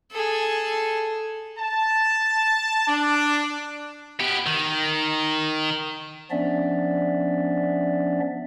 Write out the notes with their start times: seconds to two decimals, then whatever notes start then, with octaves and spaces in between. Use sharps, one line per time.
0.12 G#4 A4
1.59 A5
2.88 D4
4.20 B3 G4
4.46 D#3
6.31 F3 B3 C#4 D4 D5 E5